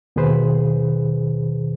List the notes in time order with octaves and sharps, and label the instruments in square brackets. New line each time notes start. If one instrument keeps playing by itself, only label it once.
[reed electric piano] D#2 B2 D#3 G#4 B4 C5